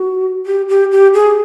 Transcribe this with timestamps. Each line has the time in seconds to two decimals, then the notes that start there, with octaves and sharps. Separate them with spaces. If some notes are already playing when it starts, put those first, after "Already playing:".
Already playing: F#4
0.46 G4
0.69 G4
0.92 G4
1.14 G#4